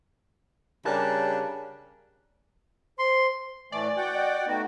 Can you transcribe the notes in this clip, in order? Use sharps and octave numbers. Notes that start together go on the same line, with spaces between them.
C#3 G3 D4 A#4 A5 F#6
C5 C6
A2 E3 A3 D5 G#5
F#4 F#5 G5
D#5
A3 B3 D#4 F#4 G5